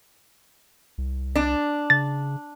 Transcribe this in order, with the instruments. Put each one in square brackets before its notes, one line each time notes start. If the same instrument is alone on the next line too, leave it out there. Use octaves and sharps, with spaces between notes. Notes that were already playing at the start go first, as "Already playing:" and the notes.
[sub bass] C2
[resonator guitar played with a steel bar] D4
[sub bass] C#3 [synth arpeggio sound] A6